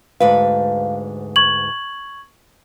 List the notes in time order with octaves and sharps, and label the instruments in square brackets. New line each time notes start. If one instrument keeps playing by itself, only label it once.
[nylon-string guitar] D2 G#2 B4 [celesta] F5
[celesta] C#6 G#6 F#7